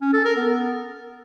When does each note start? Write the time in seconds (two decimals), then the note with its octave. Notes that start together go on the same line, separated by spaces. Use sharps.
0.01 C#4
0.13 A4
0.25 A#4
0.36 B3